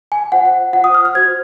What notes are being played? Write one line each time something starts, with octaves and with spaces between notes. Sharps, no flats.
G#5
F4 C5 F#5
F#5
F4 C5 F#5
D#6
F6
F6
F#4 C5 G#6